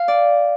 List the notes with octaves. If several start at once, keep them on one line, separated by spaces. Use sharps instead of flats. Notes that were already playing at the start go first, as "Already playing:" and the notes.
Already playing: F5
D5